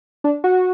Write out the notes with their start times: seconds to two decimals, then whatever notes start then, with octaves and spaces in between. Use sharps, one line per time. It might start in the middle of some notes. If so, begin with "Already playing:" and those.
0.24 D4
0.44 F#4